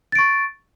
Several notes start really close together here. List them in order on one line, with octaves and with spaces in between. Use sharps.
A6 D7 C#6